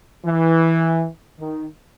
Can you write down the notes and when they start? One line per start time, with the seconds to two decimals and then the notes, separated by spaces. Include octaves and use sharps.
0.25 E3
1.39 D#3